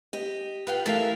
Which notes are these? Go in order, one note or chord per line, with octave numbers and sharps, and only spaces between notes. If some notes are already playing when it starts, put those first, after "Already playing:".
G4 D#5
F4 B4 F5 G5
E3 A3 A4 A#4 E5 F5